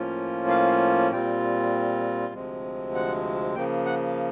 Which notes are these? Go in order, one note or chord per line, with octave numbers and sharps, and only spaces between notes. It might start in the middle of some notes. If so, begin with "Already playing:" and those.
Already playing: A2 F3 A#3 C#4 F4
F5
A#2 G3 C4 F4 G5
D2 C3 F3 G#3 C4
F#5
C#3 F3 A#3 G5
F#5